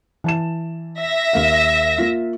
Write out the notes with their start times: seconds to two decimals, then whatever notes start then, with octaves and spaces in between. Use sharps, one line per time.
0.24 E3 A5 E7
0.99 E5 A#6
1.33 D#2 A#3 F5
1.98 A#3 F4